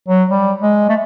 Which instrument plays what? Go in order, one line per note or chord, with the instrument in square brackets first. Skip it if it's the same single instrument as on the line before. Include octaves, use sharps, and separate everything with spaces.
[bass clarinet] F#3
G3
G#3
A3